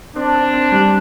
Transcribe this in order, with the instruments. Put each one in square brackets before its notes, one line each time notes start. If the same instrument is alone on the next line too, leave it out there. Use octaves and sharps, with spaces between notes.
[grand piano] C4 [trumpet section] D4
[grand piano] C4
C4
G3